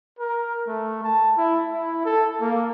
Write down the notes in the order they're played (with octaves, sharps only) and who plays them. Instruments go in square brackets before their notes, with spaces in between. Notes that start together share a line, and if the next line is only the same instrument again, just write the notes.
[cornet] A#4
A3
A5
E4
E4
A4
A#3